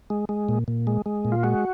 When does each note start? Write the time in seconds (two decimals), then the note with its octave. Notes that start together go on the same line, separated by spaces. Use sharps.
0.10 G#3
0.29 G#3
0.49 A#2
0.68 A#2
0.87 G#3
1.06 G#3
1.25 A#2
1.32 F4
1.43 G#3 F#4